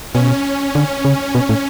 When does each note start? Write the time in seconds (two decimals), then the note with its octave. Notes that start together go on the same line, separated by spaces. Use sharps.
0.15 B2 C#4
0.75 D3
1.05 C#3
1.35 B2
1.49 A2